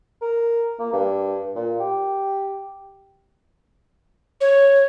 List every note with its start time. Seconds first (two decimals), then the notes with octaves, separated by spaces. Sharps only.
0.22 A#4
0.79 A#3
0.93 G2
1.56 A#2
1.80 G4
4.41 C#5